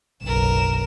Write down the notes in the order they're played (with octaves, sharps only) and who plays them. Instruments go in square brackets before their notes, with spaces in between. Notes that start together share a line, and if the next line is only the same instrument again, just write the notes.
[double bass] F#1 B1 [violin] A#4 E7